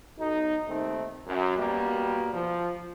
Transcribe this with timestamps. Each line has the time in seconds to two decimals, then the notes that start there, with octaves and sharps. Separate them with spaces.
0.18 B1 D#4
0.67 D#2 D#3 A3 C4
1.27 F#2
1.58 B2 G3 A#3
2.34 F3